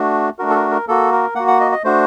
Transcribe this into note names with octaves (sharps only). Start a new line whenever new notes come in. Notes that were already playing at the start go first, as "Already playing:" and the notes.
Already playing: A3 D4 F#4
A3 D4 F#4 A#4
A4
A#4
A#4
A#3 F#4 A4
A#4
A#3 F#4 F#5
F#5
D#5
D#5
A3 D4 F#4 C5